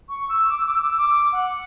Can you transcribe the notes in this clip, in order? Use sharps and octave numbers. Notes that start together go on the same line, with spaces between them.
C#6
E6
D6
E6
D6
E6
D6
E6
D6
F#5